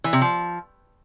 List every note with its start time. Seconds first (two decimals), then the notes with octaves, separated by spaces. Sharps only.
0.04 E3
0.13 C3
0.21 F3